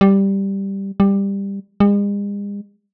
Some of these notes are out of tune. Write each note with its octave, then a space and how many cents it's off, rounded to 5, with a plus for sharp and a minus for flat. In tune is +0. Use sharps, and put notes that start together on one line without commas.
G3 +0
G3 +15
G#3 -45